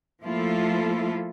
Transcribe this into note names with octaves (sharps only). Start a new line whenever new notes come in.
F3 A3 A#3 E4 F4 A4